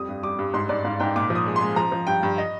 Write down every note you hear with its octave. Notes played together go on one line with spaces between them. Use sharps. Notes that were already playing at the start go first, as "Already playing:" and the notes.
Already playing: F2 G3 D#6
G2
G3 D6
G2
G#2 C6
G#2 D5
G#2 F5
G#2 G5
A#2 D6
F3
D#6
G#3
C6
G#3
F3 A#5
F3
G2 G5
G2
D#5